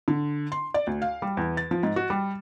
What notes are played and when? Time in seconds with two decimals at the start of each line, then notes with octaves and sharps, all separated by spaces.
0.08 D3
0.52 C6
0.74 D5
0.87 D2
1.02 F5
1.22 G3
1.37 E2
1.57 A6
1.71 F3
1.83 G#2
1.96 F#4
2.10 G3